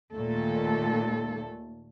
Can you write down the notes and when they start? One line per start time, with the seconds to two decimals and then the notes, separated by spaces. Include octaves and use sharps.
0.14 D#2 A#2 A3 A4